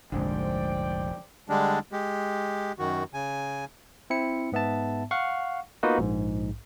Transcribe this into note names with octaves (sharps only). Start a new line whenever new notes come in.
F1 A#1 G#2 D3 C5 D5 G5
D3 G3 G#3 D4
G#3 G4
F#2 D#3 F#4
C#3 G#5
C4 E4 C#7
G#2 B3 E5 A5
F5 F#5 C#6
A#3 B3 D#4 F4 F#4 B4
A#1 G#2